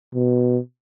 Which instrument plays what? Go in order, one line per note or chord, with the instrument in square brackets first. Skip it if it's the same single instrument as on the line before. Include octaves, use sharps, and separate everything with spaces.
[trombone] B2